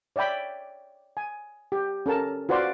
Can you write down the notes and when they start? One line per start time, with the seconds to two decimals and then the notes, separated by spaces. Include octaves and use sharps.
0.16 C#5 D5 E5 G5 B5
1.17 G#5
1.72 G4
2.06 C#4 A4 A#4 A5
2.49 F4 F#4 B4 C5 D5 C6